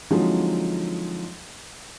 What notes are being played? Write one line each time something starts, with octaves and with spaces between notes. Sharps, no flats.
D3 F3 F#3 G#3 C4 D#4